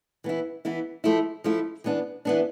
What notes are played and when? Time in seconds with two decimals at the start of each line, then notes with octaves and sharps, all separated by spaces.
0.24 E3 B3 E4
0.65 E3 B3 E4
1.04 F3 A3 E4
1.44 F3 A3 E4
1.84 E3 B3 D4
2.25 E3 B3 D4